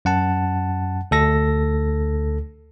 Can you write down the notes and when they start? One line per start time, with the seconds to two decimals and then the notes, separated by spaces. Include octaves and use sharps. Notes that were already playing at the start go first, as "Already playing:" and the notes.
0.05 F#2 F#5 A5
1.11 D2 A4 A#6